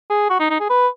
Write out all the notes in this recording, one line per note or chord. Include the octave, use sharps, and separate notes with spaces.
G#4
F#4
D#4
D#4
G#4
B4